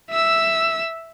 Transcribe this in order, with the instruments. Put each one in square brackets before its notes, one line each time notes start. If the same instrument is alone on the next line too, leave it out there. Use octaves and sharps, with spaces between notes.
[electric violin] E5 E6